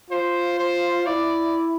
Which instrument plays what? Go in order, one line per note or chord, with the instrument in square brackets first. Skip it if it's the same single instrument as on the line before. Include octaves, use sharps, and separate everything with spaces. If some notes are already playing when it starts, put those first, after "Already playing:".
[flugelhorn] F4 [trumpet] C5
[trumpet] C5
[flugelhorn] E4 [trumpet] D5